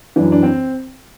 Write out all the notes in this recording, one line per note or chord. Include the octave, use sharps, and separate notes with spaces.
F#2 E3 D4
D4
C4